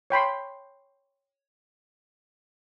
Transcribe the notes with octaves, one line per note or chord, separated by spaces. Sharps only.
C#5 G5 B5 C6